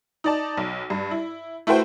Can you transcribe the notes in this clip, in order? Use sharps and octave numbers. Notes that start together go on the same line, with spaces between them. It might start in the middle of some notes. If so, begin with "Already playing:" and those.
D#4 D5 A5
B1
G2
E4
A3 E4 F#4 B4 C5 G5